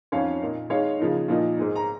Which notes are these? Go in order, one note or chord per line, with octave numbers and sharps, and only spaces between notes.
F2 D#3 C#4 C#5 F5
A#2 A#3 D#4
D#3 G#3 D#4 C#5 F5
C#3 F3 A#3 D#4
A#2 F3 A#3 D#4
G#2 G#3 D#4
A#5